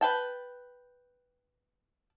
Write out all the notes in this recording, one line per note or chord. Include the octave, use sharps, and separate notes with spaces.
B4 G5 A5